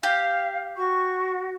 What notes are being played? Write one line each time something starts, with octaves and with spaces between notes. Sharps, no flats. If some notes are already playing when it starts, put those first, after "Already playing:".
G4 F5
F#4 C#6